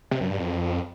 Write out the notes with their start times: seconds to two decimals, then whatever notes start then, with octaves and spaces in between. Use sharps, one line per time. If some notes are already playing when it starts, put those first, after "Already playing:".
0.11 C3
0.21 F#2
0.30 G2
0.39 F2